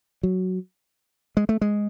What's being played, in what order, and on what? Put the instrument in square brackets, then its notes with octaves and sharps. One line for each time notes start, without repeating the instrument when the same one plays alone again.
[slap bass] F#3
G#3
A3
G#3